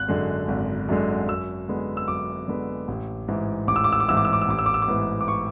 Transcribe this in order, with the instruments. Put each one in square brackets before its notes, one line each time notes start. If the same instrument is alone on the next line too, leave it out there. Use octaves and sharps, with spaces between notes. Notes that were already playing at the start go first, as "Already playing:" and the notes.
Already playing: [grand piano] G#1 F#6
F#2 D3 G#3
G#1
F#2 D3 G#3
F#2 E6
D3 G#3 B3
E6
F#2 D6
D3 G#3 B3
A1
G#2 E3
A1 D6
E6
D6
E6
D6
G#2 E3 E6
D6
E6
D6
E6
A1 D6
E6
D6
E6
D6
G#2 E3 B3
D6
C#6